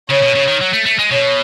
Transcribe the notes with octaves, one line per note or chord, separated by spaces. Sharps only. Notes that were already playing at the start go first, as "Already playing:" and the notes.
C#3 C#5
B2
C#3
D#3
F#3
A3
A3
G#3
B2 C#5